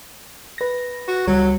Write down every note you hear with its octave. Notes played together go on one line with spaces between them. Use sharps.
B4 A#6
F#4
C#2 F#3 G3